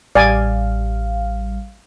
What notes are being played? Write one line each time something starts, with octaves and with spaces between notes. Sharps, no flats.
A1 G3 D5 F5 G#5